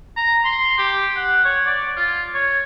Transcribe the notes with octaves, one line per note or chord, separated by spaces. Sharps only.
A#5
C6
G4
F#5
C#5
D5
F4
C#5